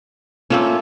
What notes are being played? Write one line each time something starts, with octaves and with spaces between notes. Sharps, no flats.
A3 A#3 C4 C#4 F4